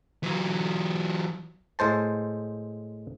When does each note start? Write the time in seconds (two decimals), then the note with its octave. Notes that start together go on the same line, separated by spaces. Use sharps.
0.23 E3 F#3
1.79 A2 G#3 C5 A5